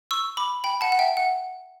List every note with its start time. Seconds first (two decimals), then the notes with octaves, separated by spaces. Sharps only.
0.11 C#6 E6
0.37 B5 D6
0.64 G5 B5
0.81 F#5 A5
0.92 F#5
0.99 E5 G5
1.17 F#5